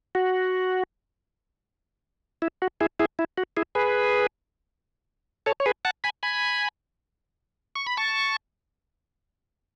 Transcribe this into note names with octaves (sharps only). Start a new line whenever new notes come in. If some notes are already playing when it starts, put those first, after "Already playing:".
F#4
E4
F#4
E4 G#4
E4 G#4
E4
F#4
E4 G#4
G#4 B4
A4 C#5
C#5
G#4 B4
F#5 A5
G#5 B5
G#5 B5
C#6
B5
A5 C#6